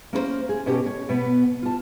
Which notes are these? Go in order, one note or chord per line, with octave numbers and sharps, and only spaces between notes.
A#3 C#4 A#4 C5
G#4
B2 C#4 F#4 G4 A4
C#5
B2 B3
F4 A5